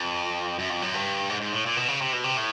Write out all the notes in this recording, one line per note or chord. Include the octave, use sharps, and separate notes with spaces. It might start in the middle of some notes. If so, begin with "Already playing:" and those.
Already playing: F2
F#2
F2
F#2
G2
G#2
G#2
A2
A#2
B2
C#3
C3
B2
C3
A2